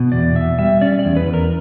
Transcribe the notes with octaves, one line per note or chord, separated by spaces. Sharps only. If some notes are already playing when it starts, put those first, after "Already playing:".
Already playing: B2
E2 D5
B2 E5
G3 E5
C#4 D5
D5
E2
B4
E2
A#4